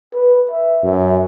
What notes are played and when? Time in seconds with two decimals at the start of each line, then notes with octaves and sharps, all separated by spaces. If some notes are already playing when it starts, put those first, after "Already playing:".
0.14 B4
0.51 E5
0.84 F#2